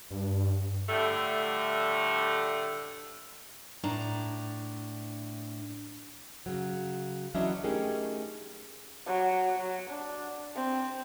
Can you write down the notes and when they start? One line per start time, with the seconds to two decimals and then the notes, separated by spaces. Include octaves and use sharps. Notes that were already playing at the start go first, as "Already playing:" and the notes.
0.11 G2
0.89 A2 D3 G3 A3
3.83 A2 D4 A#5
6.46 C#3 F#3
7.34 E3 F#3 C#4 D4 D#5 E5
7.63 A3 C#4 D#4 G4 G#4 A#4
9.07 F#3
9.59 F#3
9.90 D4
10.55 C4